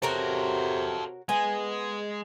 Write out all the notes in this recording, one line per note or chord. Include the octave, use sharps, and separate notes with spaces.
C3 F#4 A4 A#4 C5 C#5
G#3 B3 G#5